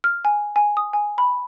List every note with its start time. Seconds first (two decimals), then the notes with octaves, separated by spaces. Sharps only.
0.04 F6
0.25 G#5
0.56 G#5
0.77 D#6
0.93 G#5
1.18 B5